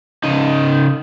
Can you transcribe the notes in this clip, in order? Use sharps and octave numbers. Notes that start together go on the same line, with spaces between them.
C#3 D#4